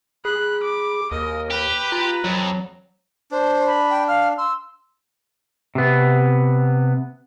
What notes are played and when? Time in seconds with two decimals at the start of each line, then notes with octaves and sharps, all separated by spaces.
0.25 G#4 B5 F#6
0.64 D6
1.11 D#2 A#4 D#5
1.51 G4 B4
1.92 F4 A#5
2.24 F2 F#3
3.31 D4 C5
3.67 B5
3.90 G5
4.08 F5 F6
4.38 C6 E6
5.75 C3 B3